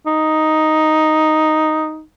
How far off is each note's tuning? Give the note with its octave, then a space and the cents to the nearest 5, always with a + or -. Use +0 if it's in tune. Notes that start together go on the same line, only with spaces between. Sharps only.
D#4 +0